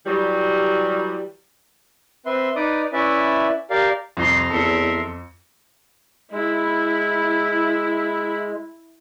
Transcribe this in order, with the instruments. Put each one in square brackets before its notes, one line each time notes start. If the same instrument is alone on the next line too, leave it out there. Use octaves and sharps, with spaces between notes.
[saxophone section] E3 F#3 G3
[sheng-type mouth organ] C4 B4 E5 C6
D#4 B4 D5 D6 D#6
C#4 E4 B4 D5 E5
G4 A#4 D5 F5
[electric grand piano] C2 [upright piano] F2 [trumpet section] A#5 C6
[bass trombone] E2 [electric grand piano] A4 C#7 [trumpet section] A#4 E5 C6
[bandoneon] G#3 [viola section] E4